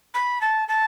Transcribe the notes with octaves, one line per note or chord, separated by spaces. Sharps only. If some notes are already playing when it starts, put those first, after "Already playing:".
B5
A5
A5